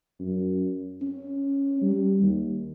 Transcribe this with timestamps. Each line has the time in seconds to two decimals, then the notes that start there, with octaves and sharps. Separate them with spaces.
0.20 F#2
1.01 C#4
1.81 G3
2.22 D#2